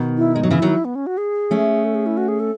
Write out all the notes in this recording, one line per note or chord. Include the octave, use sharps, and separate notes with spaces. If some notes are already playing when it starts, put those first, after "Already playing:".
Already playing: B2 D#3
E4
G#3 D#4
F#3
C#3 E3 E4
D#3 F#3
B3
C#4
F#4
G#4
A3 C#4
A4
G#4
E4
F#4
G#4
A4